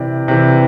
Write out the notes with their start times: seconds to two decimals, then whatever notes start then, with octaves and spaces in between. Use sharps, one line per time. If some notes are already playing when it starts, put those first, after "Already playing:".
Already playing: C3 E3 D5
0.28 C3 E3